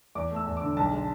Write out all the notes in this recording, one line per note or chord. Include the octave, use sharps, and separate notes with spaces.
E2 D6
A3
E6
E2
D6
D3
B1 A5
G#3